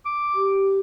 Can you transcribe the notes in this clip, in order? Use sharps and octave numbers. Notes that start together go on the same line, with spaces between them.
D6
G4